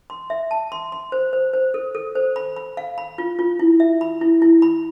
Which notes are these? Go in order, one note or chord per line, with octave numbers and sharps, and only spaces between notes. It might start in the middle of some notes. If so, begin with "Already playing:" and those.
C6
E5
A5
C6
C6
C5
C5
C5
A4
A4
C5
B5
B5
F5
B5
F4
F4
E4
E5
B5
E4
E4
B5